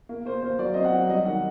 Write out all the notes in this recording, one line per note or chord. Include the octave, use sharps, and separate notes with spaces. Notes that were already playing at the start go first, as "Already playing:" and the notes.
A#3
A#3 C5
A#3 C5
F#3 D5
C4 D#5
F#5
F#3
G3 D#5
D#3 F#5